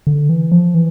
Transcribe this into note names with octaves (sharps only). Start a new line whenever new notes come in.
D3
E3
F3
E3